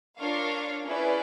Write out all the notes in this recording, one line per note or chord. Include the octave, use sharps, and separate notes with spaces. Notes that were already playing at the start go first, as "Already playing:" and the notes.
D4 F4 A#4 C#5 F5
C#4 E4 G#4 B4 D5